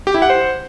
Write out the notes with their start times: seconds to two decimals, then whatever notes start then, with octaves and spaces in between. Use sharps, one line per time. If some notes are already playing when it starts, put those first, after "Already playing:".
0.07 G4
0.14 E4
0.22 F#5
0.30 C5